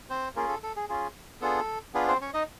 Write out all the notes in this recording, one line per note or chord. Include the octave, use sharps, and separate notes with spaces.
C4 C5
A#3 C#4 F4 G#4 A#4
A4
A4
G#4
C#4 F4 G#4
B3 D4 F4 G#4 A4
B3 D4 F4 G#4 B4
C4 C5
C#4 C#5
D#4 D#5